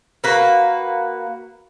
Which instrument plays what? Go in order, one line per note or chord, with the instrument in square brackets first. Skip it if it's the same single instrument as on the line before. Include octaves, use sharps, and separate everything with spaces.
[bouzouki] A#3 F#4 B4